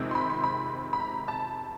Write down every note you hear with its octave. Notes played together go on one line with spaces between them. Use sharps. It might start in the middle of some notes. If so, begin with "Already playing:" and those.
Already playing: F2 C3 D#3 G#3 C4
C6
B5
C6
B5
B5
A#5
A5